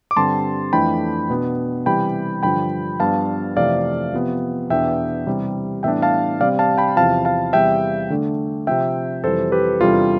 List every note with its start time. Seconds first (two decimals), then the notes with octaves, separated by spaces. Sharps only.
0.11 D6
0.16 G2 D3 G3 C4 A5 C6
0.73 F2 E3 A3 D4 G5 B5
1.30 B2 B3 D4
1.86 C3 E3 G3 G5 B5
2.43 G2 D3 F3 G5 B5
3.00 G2 F3 B3 D4 F5 A5
3.56 F2 C3 E3 A3 D5 F5
4.13 C3 F3 B3
4.70 E2 B2 B3 D4 E5 G5
5.27 C3 E3 G3
5.83 A2 E3 G3 B3 D4 E5 G5
6.02 F5 A5
6.40 C3 G3 C4 D5 F5
6.59 F5 A5
6.78 G5 B5
6.96 E2 C3 F3 F5 A5
7.25 F5 A5
7.53 E2 C3 G3 E5 G5
8.10 D3 A3 D4
8.67 C3 F3 C4 E5 G5
9.24 F2 C3 E3 G3 A4 C5
9.52 G4 B4
9.80 E2 C3 G3 D4 F4 A4